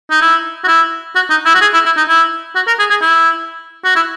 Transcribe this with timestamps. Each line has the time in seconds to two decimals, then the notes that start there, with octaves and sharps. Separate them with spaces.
0.11 D#4
0.22 E4
0.64 F#4
0.68 E4
1.15 F#4
1.30 D#4
1.46 E4
1.55 F#4
1.61 G#4
1.74 E4
1.86 E4
1.97 D#4
2.09 E4
2.55 F#4
2.67 A#4
2.79 G#4
2.90 G#4
3.02 E4
3.85 F#4
3.96 E4